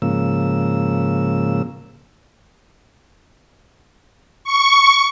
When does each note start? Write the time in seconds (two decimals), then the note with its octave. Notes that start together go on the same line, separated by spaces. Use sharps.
0.02 G#2 C#3 F3 A#3 E6
4.44 C#6